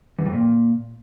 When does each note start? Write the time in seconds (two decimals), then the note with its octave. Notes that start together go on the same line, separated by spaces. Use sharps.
0.19 E2
0.26 F2
0.33 A#2